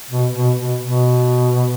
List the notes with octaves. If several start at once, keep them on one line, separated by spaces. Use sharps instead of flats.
B2
B2
B2
B2